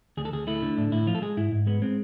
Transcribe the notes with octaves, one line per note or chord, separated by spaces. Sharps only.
D2 G#4
A4
D2 G#4
A3 E4
D3
A2 D4
A2 E4
F3 F4
A4
G#3 G#4
G#2 E4
G#2
G#3 B3
G#3 C4